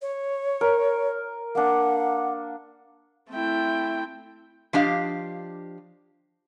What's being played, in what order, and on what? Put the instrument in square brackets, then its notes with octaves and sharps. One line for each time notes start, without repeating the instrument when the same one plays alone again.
[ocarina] C#5
[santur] A#4
[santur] A#3 D4 [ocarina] F#5
[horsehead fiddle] A3 E4 [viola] C4 G5
[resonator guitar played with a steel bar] F3 D4 G4 D#5 F5